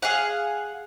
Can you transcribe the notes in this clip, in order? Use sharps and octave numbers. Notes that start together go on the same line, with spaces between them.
G#4 F5 F#5